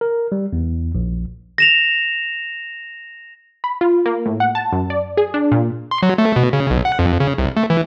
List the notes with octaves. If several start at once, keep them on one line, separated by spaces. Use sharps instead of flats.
A#4
G3
E2
A#1
A#6 E7 F7
B5
F4
A#3
A2
F#5
A5
F#2
D5
G#4
D4
A#2
C6
F#3
A3
B2
C#3
B1
F#5
F2
C#3
C2
A3
E3